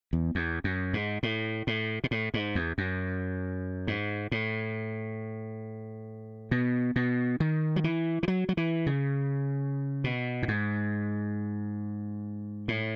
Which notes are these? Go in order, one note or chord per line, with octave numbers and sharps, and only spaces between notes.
E2
E2
F#2
G#2
A2
A2
B2
A2
G#2
E2
F#2
G#2
A2
B2
B2
D#3
F#3
E3
E3
F#3
F#3
E3
C#3
B2
A2
G#2
A2